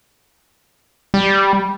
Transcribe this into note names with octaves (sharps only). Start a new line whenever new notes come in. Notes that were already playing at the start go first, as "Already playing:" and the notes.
G3